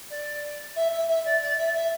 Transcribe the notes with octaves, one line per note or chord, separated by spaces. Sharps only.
D5
E5
E5
E5
D5
D5
E5
E5